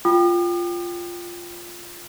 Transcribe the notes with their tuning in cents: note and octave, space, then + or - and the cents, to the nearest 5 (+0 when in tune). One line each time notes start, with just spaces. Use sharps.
F4 +0 G5 +0 D#6 -45